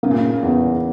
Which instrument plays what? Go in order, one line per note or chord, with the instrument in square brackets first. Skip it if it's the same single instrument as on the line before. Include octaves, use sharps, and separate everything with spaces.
[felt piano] C#3 [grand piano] A#3
[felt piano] A#2
C#3
[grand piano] E2